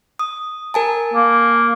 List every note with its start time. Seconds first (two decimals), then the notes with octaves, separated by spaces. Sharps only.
0.19 D#6
0.74 A#4 G#5 A5
1.14 A#3